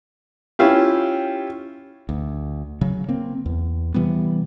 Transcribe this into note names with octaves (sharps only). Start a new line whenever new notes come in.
C#4 E4 F4 G4
D2
C#3 F#3
A#3 C4
E2
C3 E3 G3 B3